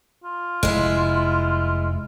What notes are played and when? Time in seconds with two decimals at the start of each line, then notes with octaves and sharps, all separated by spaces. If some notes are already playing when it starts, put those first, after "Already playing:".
0.24 F4
0.63 F1 G#3 E4